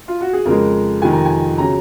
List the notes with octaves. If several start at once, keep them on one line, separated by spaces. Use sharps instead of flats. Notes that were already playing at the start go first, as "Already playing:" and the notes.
F4
F#4
G#4
F2 C#3 G#3 A#4
F2 C3 D#3 G#5
A#5
G#5
C#3 F#3 A#5